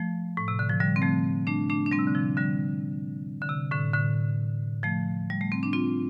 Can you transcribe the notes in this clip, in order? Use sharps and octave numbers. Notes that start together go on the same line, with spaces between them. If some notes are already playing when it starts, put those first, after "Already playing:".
Already playing: F3 A3
A2
C3
D3
F3
D3 G3
C4
F3 A3
A3 D4
A3 D4
D4
G3 C4
C3
D3
C3 F3
D3 G3
D3
C3
A2 D3
A2 D3
F3 A3
G3
A3
C4
D4
C4 F4